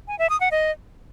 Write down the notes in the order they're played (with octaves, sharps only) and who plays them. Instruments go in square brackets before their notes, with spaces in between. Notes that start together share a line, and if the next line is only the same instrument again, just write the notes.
[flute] G#5
E5
D#6
F#5
D#5